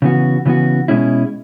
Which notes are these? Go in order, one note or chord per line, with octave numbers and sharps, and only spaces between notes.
C#3 E3 B3 F#4
C#3 E3 B3 F#4
B2 G#3 C#4 E4